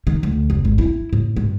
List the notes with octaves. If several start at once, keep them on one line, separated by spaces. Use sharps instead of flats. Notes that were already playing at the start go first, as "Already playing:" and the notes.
D#3
D2
F1
G#1
E4
A2
G2